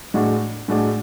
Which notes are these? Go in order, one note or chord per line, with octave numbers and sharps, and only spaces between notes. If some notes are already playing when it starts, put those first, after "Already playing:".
A2 G#3 D4 F#4
A2 G#3 D4 F#4